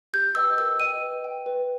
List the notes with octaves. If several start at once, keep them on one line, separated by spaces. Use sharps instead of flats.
G4 G6
B4 D#5 G5 E6
A#4 E6
D#5 G5 D#7
B4
G5
B4